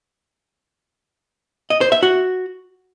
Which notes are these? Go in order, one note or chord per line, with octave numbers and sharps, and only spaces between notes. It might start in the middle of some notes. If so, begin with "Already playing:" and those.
D#5
C5
E5
F#4